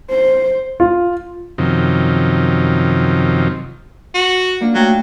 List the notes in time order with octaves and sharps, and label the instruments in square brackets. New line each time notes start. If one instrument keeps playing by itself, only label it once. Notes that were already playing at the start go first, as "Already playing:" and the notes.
[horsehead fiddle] C5
[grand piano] F4
[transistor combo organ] F#2 C3 D#3 F3
[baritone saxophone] F#4
[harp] A#3 D4 F4
[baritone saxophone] F#3 [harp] A3 G5